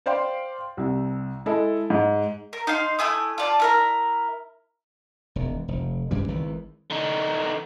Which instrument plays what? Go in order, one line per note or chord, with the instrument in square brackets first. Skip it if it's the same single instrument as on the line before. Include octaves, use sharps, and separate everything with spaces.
[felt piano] C5 D5 F5 G5 C6
C2 C3
G#3 E4 A4
G#2
[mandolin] A#4
D#4 F5 C6
A3 E4 G#5 D#6
F4 D5 A5
E4 A#4 A#5
[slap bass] E1 D#2
F1
G2 C#3 E3 G3
G#1 D#3 E3
[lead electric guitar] D3 D#4